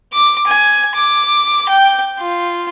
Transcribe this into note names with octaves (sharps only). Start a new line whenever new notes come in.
D6
G#5
D6
G5
F4